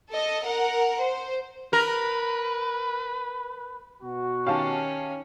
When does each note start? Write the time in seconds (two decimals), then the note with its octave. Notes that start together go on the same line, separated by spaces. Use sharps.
0.10 A4 D#5
0.43 A#4 F#5
1.00 C5
1.73 A#4 B4
4.03 B2 F#4
4.47 D#3 C#4 G4 F5 A5